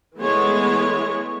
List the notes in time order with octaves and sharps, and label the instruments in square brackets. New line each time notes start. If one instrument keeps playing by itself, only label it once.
[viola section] E3 G#3 A3 B3 E4 C#5